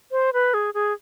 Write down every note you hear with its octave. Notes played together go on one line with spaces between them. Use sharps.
C5
B4
G#4
G#4